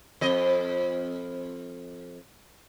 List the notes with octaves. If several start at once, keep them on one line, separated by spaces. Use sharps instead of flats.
F2 D#5